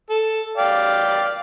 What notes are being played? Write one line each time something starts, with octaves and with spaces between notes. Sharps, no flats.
A4
D5 F5 G5